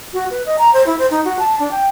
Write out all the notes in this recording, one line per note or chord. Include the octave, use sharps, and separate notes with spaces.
F#4
B4
D#5
A#5
C5
E4
C5
D#4
F#4
A5
D4
G5